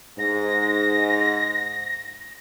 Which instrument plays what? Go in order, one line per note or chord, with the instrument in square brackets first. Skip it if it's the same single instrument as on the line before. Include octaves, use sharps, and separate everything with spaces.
[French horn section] G#2 [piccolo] A#6